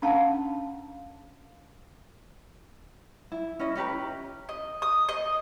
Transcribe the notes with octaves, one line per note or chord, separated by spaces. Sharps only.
C#4 D4 F5 F#5 A5
E4
C#4 E4 D#5
C#4 G4 B4 A#5
D#5
D#6
D#5